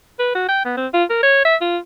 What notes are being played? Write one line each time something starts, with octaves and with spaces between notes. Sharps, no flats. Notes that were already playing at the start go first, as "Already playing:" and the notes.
B4
F#4
G5
B3
C4
F4
A#4
C#5
E5
F4